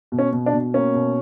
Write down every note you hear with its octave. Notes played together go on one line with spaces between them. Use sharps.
B2
C#4
B2
D4
B2
A#3 C#4
B2